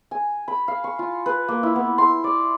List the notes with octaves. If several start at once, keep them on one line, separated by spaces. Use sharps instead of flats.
G#5
B5
F5
C#6
F4
B4
A#3
E4
B3
C6
D5